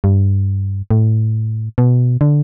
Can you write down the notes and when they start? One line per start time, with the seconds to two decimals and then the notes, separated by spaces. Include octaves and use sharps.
0.04 G2
0.91 A2
1.78 B2
2.21 D3